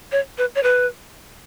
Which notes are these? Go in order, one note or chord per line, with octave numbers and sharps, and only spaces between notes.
C#5
B4
C#5
B4